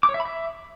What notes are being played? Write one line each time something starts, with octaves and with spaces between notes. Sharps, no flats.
D6
C#5
E5
B5
E5